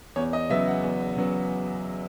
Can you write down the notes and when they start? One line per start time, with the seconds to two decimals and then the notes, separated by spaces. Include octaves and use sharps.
0.16 E2 C#5
0.33 D#5
0.50 C#3 F#3 B3 E5
0.67 F#5
0.84 E2
1.16 C#3 F#3 B3